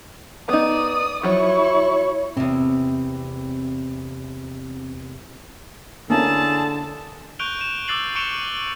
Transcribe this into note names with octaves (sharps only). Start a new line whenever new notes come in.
B3 D#4 D5 D#6
F3 F#3 E4 C#5 C#6
E2 C3 C4
D3 A#3 C#4 E4 G#4 A4 A5
C#6 F#6 G6 D7 F7 G7
E7 F7
D6 E6 F#6 A6 C7 F#7
C#6 C#7 D7 E7 F7 G7
G7